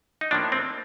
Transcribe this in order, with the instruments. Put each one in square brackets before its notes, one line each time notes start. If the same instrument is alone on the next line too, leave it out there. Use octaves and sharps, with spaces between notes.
[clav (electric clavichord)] D#4
A2 F3 A#3 D4
C4